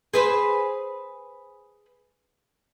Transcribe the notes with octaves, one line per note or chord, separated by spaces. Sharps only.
G#4 B4 C5